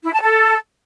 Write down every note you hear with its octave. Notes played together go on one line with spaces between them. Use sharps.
E4
A5
A4